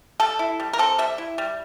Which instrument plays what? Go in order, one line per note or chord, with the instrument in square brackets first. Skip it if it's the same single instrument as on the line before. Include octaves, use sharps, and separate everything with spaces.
[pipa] G3 A4
E4
G3
A#4
C4 A4
G3 E5
E4
G3